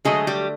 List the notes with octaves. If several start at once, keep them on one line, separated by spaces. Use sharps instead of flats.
D3 F#3 G#3 A3 G#4
G3 G4